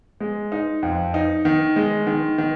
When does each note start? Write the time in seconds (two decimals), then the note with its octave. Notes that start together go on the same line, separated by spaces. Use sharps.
0.20 G#3
0.52 D#4
0.83 F2
1.14 D#4
1.45 D#3
1.76 G#3
2.07 D#3
2.38 D#3